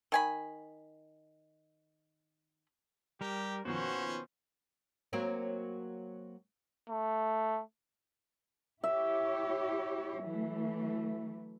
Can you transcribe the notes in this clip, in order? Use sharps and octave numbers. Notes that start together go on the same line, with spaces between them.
D#3 G#5 B5
G3 G4 A#4
B2 D#3 F3 A#3 C#4 F#4 B4 C5
F#3 A#3 C4
A3
E4 G4 C#5 E5
E3 F#3 A3